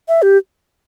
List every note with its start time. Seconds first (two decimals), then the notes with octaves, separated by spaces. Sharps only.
0.08 E5
0.22 G4